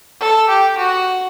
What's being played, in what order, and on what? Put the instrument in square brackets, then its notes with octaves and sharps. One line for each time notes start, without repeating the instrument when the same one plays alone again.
[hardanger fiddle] A4
G4
F#4